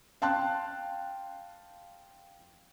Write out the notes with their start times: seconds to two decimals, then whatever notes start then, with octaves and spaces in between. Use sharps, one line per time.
0.22 F5 G5 A5 C6 F#6